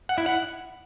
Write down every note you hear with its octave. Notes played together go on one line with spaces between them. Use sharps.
F#5
E4
F#5